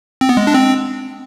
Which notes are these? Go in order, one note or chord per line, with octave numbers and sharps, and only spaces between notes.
C4
B3
G#3
D4
C4